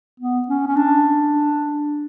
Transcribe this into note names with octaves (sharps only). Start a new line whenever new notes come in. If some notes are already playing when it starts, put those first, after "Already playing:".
B3
C#4
C#4
D4